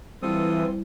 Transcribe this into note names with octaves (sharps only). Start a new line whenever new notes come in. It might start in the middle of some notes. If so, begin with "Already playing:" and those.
E3 G3 C4 E4 F4 A4 D#6